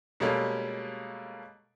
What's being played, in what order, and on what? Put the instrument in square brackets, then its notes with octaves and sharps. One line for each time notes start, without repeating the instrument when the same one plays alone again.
[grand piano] B2 G3 G#3 A#3 C#4 A4